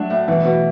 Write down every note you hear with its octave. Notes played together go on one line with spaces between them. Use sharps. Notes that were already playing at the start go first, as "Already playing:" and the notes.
Already playing: F#3 A3 D4
A2
B2 E3
B2